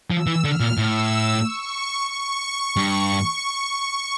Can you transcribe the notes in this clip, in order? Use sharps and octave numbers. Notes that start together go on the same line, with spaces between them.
F3 E6
E3
D3 F6
A#2
A2 E6
C#6
C#6
G2